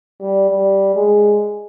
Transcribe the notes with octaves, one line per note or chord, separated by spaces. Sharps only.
G3
G3
G#3